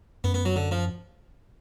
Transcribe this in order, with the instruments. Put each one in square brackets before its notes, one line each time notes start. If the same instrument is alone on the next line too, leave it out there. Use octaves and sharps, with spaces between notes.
[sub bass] F#2 [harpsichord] B3
[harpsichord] B3
F#3
D3
F3